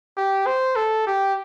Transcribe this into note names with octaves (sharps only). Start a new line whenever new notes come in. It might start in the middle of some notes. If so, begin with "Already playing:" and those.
G4
C5
A4
G4